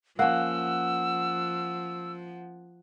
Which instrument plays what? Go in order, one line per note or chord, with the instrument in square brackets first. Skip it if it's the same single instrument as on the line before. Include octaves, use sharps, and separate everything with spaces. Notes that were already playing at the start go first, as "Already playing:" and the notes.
[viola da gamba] F3 [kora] A#3 C#4 [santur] F#5 [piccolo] E6